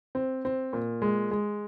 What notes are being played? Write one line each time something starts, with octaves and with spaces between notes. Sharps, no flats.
C4
C4
A#2
G#3
G#3